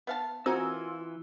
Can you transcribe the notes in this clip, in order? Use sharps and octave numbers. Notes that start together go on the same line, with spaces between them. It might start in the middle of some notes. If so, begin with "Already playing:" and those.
B3 F5 A5
E3 C4 F4 F#4 A#4 D#5 G#5 E6